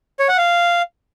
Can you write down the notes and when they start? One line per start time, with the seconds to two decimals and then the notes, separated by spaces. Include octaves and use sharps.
0.19 C#5
0.29 F#5
0.38 F5